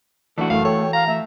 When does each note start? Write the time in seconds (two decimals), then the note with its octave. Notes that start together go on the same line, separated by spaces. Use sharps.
0.38 E3 A3 D4 F#4 A4
0.50 F#1 A3 F5
0.65 A4 C#5 G5
0.81 A4 G5
0.93 F5 A#5
1.07 A3 E5